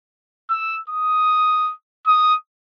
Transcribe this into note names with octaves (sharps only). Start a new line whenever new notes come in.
E6
D#6
D#6